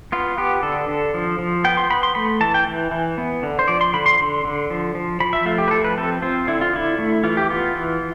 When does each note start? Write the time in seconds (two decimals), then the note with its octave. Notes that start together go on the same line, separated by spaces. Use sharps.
0.12 B3 F4
0.38 B3 G4
0.63 D3 A4
0.89 D3
1.14 F3
1.39 F3
1.64 B3 G5
1.77 C6
1.90 B3 B5
2.03 C6
2.15 A3 B5
2.41 E3 A5
2.54 G5
2.67 E3
2.91 E3
3.18 B3
3.43 D3
3.59 C5
3.68 F3 D5
3.81 C6
3.93 D3 B5
4.06 C6
4.20 D3
4.45 D3
4.70 F3
4.95 F3
5.20 F3 B5
5.33 E5
5.46 A3 F4
5.58 G4
5.68 B4
5.71 F3 A4
5.84 B4
5.97 C4 A4
6.22 C4 F4
6.47 D3 E4
6.61 F4
6.73 D3 E4
6.99 A3
7.24 E3 F4
7.37 G4
7.50 B3 F4
7.75 E3